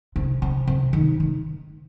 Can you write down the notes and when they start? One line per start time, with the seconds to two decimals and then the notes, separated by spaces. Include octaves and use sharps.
0.16 C3
0.42 C3
0.67 C3
0.93 D#3
1.20 D#3